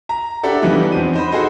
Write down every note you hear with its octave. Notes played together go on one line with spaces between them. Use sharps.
A#5
D4 G4 A4 D5 E5 F#5
E3 F3 G3 B3 D4 D#4
E2 C4 D#7
D#4 C5 B5
F#4 G#4 A4 C5 D#5